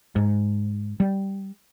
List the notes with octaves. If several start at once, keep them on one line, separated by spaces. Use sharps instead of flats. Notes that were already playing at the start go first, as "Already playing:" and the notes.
G#2
G3